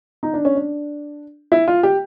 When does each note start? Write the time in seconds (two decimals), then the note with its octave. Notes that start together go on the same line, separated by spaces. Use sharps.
0.23 D#4
0.34 D4
0.45 C#4
0.55 D4
1.52 E4
1.68 F4
1.83 G4